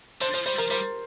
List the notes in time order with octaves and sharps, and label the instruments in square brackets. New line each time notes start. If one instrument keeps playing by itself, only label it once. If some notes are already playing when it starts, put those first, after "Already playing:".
[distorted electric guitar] D3 [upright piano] C5
[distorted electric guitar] F3 [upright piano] C5
[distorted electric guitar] G3 [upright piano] C5
[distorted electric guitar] F3 [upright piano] A#4
[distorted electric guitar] G3 [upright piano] C5